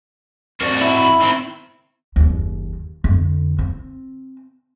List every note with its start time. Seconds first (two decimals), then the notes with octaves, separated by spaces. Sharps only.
0.61 F2 F#4 A#4 D5
0.81 E4
0.98 B5
1.22 D#3 C4
2.16 F#1 D#2
3.04 F2 D3
3.59 C4